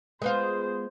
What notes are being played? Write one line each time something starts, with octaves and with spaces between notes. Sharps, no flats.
G#3 B3 F4 C5